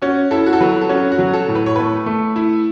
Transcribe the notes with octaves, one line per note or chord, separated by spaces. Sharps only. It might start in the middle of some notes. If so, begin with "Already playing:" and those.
C#4 F#4
E4 A4
F#4
A4
F#3 B4
A4
C#4 F#4
F#4
F#3
A4
A2
B4
C#5
A3 B4
A3
E4